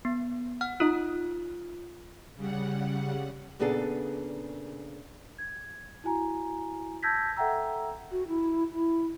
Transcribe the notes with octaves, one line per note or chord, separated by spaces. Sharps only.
B3
F#5 F6
D#4 F4 D#6
C#3 G3 F#5
A#2 C#3 B3 D4 G#4 A4
G#6
E4 F#4 G#5 A#5
A5 E6 G6 G#6 A#6 B6
A4 E5 F#5 G5 A#5 E6
F#4
E4
E4